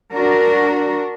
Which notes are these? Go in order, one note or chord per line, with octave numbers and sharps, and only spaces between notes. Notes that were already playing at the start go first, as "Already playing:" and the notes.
D4 F#4 A#4